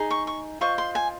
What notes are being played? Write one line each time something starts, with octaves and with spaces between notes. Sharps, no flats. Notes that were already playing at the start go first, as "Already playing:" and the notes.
Already playing: D#4 G#4
C#6
C#6
F4 C5 D#5 C#6
C6
G#5